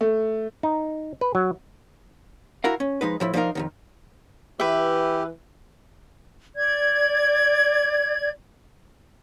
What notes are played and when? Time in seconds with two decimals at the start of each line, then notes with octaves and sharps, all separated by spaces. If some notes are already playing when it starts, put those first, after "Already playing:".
0.01 A3
0.63 D#4
1.21 B4
1.35 F#3
2.64 E4 F#4 A#4 F5
2.80 C#4
3.01 F3 G#3 D#4 B4
3.20 A2 F3 E4
3.34 F3 D4 D#4 G4 A#4 F5
3.55 F2 B2 D#3
4.60 E3 G4 B4 E5
6.55 D5 G#6